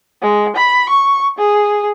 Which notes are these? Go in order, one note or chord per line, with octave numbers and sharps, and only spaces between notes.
G#3
B5
C#6
G#4